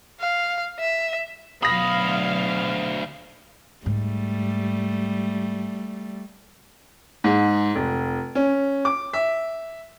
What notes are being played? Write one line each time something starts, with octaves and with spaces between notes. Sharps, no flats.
F5
E5
D2 B2 F#3 F5 B5 D#6 A#6
G#2 G3 A3
G#2
F1
C#4
D6
E5